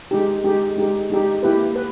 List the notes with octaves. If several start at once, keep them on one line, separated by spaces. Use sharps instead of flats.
G#3 D#4 G4
G#3 D#4 G4
G#3 D#4 G4
G#3 D#4 G4
A#3 E4 G4 B4
B4